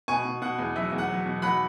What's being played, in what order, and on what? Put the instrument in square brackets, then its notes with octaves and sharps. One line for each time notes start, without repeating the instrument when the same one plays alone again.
[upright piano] B2 G#5 C#6
B2
B2 F#5
E2
F#3 E5
E2
F#5
F#3
B2
F#3 F#5 B5